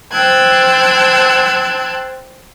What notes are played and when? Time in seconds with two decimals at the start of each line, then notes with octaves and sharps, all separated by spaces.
0.12 C5 G5 A5 E6 F#6 G#6